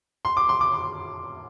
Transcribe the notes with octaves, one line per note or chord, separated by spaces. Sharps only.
C6
D6
C6
D6
C6